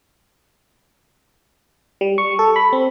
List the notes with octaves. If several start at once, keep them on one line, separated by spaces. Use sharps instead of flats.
G3
C#6
A4
B5
C4